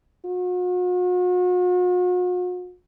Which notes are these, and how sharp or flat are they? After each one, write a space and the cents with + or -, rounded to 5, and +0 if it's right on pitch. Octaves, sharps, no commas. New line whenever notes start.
F#4 -45